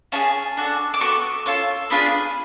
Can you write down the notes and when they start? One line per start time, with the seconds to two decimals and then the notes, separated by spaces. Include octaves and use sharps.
0.12 C#4 F4 G#4 A5
0.57 D4 F#4 A4
0.94 D6
1.00 B3 F#4 A4 C#6
1.46 C#4 F4 A4
1.90 B3 D4 F4 G#4 B5